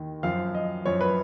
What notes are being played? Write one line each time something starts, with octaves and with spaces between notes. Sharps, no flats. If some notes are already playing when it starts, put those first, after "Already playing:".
Already playing: D#2 D#3
F#2 F3 F5
D#5
F#2 F3 C#5
B4